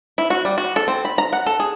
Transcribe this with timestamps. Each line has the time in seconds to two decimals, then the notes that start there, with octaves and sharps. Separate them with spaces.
0.18 E4
0.30 F#4
0.45 G3
0.58 F#4
0.76 A4
0.88 C4
1.05 B5
1.18 A#5
1.33 F#5
1.46 A4
1.60 G#4